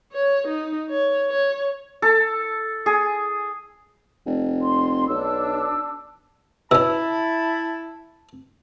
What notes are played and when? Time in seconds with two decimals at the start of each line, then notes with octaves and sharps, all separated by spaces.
0.12 C#5
0.47 D#4
0.90 C#5
1.30 C#5
2.02 A4
2.86 G#4
4.26 F1
4.63 C6
5.08 B1 D4 E6
6.71 B2 C#4 E4 A5 E6